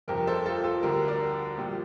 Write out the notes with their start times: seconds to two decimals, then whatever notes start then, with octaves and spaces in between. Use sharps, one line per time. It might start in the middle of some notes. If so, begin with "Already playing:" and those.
0.08 G1 F2 C3 G4 A#4
0.27 A4 C5
0.45 F4 A4
0.64 F4 A4
0.82 D2 D3 G3 G4 A#4
1.08 A#4 D5
1.57 A#1 A#2 G3